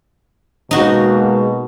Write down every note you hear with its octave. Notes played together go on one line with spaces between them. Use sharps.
B2 G#3 A#3 D#4 F#4